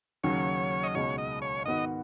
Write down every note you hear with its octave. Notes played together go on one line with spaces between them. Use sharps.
D#2 C#3 F#3 C#4 F#4 C#5
D#5
C#2 B2 G#3 D#4 F#4 C#5
D#5
C#5
G#2 D#3 B3 F#4 D#5